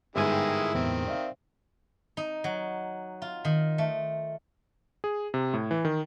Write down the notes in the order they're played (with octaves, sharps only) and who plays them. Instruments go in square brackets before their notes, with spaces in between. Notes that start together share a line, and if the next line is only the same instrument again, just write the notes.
[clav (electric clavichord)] G1 G#2 G#5 [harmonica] D#3 E3 G#3 [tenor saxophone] E4
[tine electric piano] G5
[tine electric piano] E2 A2 [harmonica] D#3 C4
[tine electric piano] D5 E5 F5
[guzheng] D#4
F#3
F4
D#3
A3
[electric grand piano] G#4
C3
A2
E3
D#3